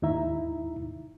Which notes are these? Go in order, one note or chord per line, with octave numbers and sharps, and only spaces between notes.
D#2 G#2 D#4 E4 E5 A#5